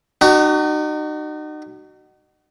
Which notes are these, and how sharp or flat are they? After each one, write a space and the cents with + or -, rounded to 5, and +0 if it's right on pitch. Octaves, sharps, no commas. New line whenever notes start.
D#4 -35 F#4 +30